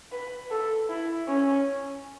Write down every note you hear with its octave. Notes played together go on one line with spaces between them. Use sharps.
B4
A4
E4
C#4